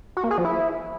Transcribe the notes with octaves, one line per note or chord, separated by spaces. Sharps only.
F#4
A#3
G#4
F3
E4